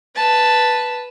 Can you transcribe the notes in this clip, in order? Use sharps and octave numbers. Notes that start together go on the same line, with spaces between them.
B4 A5